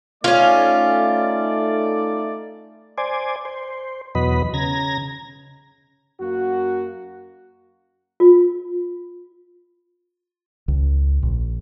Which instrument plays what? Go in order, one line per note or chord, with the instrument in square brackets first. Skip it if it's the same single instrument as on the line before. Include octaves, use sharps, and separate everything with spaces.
[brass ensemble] A3 D#4 D5 [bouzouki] C#4 F5 [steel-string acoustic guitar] F4
[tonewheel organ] C5 D5 G#5
C5
E2 B2 F#3 B4 D#5 B5
C#3 A#5 G#6 A#6
[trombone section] F#2 A#3 F#4
[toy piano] F4
[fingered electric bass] C#2
A#1